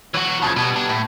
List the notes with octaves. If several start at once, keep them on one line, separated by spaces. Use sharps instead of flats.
E3 F#3 F#4
C#3 F3 A5 G#6
B2 G3 B3
D4
A2